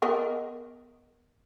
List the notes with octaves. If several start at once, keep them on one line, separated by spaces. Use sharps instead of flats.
B3 A#4 D#5